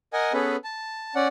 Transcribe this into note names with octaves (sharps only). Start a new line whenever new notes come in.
A#4 D#5 F#5 G#5
B3 C#4 G#4 A4 B4
A5
C#4 D5 F#5